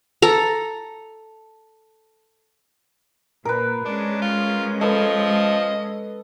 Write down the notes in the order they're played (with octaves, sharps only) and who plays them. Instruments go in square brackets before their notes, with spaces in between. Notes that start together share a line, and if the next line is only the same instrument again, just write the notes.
[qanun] A4 A#5
[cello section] A#2 [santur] A#4 B4
[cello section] G#3 C#4 [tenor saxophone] D4
[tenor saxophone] F4
[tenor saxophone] F3 [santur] A4 B4 [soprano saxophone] D#5